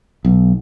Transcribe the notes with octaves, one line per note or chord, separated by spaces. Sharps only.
B1